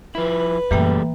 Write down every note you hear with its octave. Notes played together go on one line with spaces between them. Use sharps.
F3 E4 B4
F#2 A#2 E3 G3 A3 A#3 G5